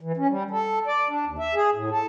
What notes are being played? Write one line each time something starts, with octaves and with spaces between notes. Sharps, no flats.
E3
C#4
G3
A4
D5
D4
D#2
E5
G#4
A2
A4